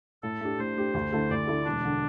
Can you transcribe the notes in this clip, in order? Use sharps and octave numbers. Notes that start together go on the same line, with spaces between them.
A2 A4
A3 D4 G4
A2 C5
A3 D4 G4
D2
D3 A3 E4 A4
D2 D5
D3 A3 E4 A4
E1 D4
D3